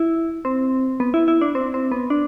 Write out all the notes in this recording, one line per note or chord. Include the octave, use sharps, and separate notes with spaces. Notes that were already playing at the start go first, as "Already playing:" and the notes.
Already playing: E4
C4
B3
E4
E4
D4
C4
C4
B3
D4